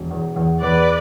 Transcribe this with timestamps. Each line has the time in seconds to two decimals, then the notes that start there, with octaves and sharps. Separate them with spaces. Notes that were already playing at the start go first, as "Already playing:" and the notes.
Already playing: E1
0.10 E2
0.36 E2
0.62 E2 B4 D5